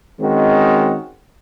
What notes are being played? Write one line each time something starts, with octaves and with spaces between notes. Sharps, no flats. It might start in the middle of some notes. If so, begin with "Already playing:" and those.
D#3 G#3 C4 C#4 F#4